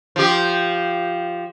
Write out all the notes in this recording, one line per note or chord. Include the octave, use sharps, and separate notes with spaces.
F3 G4